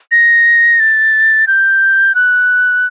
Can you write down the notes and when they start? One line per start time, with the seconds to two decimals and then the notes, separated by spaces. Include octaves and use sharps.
0.12 A#6
0.80 A6
1.47 G6
2.15 F#6